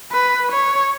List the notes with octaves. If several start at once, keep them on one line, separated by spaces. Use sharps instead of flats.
B4
C#5